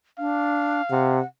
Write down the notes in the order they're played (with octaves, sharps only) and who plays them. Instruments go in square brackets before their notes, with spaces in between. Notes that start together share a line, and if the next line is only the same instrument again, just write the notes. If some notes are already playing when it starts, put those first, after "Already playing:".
[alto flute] D4 [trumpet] F5
[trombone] C3 [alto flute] F#5